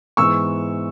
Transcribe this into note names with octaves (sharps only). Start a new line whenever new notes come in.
G#2 E3 B3 C#6 E6